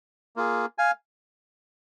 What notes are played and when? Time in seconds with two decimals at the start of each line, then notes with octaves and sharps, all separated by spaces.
0.36 A#3 F4 G#4
0.78 F5 G#5